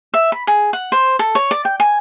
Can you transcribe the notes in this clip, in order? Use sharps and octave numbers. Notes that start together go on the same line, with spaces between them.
E5
B5
G#4
F#5
C5
A4
C#5
D5
G5
G#5